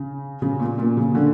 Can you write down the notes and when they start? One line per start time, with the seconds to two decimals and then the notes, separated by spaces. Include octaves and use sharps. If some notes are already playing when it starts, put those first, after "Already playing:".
Already playing: C#3
0.42 C#3
0.60 A#2
0.78 A#2
0.97 C#3
1.15 D3